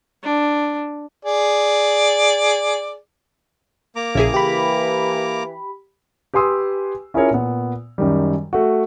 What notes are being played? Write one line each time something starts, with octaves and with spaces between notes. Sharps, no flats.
D4
G#4 D5
A#3 A#5 D6
A#1 C#3 E4 G#4
E3 G4 B5
G4 B4 G#5 C6 D#6 E6
C#4 E4 F4 G#4 A#4 C#5
A#2 B3
F#2 D#3 G3
A3 F#4